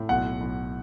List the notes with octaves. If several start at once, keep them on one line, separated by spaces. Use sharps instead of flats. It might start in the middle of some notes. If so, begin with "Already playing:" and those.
Already playing: A2
B1 F#5
B1